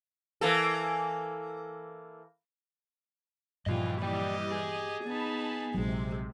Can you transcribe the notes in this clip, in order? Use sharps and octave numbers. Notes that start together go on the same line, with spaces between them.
E3 A#3 A4
G2 A#2 E3 F3 G3 A#3 F4 D#5
F#2 G4 D5 D#5 G5
G#4
B3 D#4 A5 B5
A#1 C3 F#3 G#3